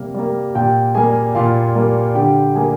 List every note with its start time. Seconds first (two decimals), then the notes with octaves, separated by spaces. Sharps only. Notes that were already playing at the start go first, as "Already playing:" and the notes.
Already playing: C3 G3 A#3
0.14 G3 A#3
0.55 A#2 G4 G5
0.95 G3 A#3 G#4 G#5
1.35 A#2 F4 F5
1.75 G3 A#3
2.15 D3 G4 G5
2.55 G3 A#3 G#4 G#5